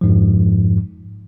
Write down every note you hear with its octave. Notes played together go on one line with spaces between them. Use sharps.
F2 G#2 F3